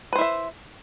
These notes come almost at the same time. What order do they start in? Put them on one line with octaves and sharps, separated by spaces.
B4 C5 E4 E5